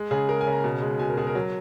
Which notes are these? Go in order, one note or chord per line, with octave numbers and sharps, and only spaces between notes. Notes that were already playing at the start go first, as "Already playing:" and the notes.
Already playing: G#3
C#3 G#4
G#3 A#4
G#5
C#3
A#5
B2
G#3
B2 G#5
A#4
B2 G#4
A#4
F#3